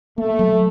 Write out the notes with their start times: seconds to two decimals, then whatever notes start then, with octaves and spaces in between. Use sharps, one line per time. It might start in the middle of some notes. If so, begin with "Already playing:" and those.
0.18 A3 A#3
0.39 F#3